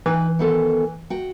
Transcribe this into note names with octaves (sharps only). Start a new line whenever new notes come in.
E3 D#4 B4 G5
D#3 B3 A4
F#4 G5